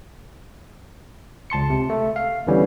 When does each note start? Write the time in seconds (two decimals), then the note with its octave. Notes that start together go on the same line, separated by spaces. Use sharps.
1.50 C#2 A5 C6 C#7
1.70 C3
1.90 A3
2.16 F5
2.47 E2 D3 E3 G3 C#4